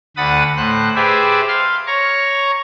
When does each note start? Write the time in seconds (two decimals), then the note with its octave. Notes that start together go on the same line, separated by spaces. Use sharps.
0.17 D2 F#5 B5 D#6 A6
0.57 A2 C5 F#6
0.95 G4 G#4 B4 C5 D5 E5
1.48 F5 C6
1.87 C#5 A#5 C#6